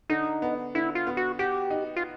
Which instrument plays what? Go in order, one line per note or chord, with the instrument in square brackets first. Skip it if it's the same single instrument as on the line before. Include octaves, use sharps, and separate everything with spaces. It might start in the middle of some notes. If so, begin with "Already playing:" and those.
[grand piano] D3 [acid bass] D#4
[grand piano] B3
[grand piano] D3 [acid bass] E4
[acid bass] F4
[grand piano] B3
[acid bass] F#4
[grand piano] F#4 [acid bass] G4
[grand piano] D#4
[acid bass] F4